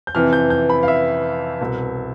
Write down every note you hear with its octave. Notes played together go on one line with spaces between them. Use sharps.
G6
F2 C3 E3 F6
G6
G6
B5
F5
E5
C2 B2